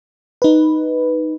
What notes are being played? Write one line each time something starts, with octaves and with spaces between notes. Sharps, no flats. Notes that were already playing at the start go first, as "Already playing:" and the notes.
D#4 B4